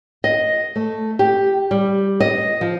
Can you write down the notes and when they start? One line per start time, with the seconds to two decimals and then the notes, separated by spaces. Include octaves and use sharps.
0.24 D#5
0.76 A3
1.19 G4
1.71 G3
2.20 D#5
2.61 F3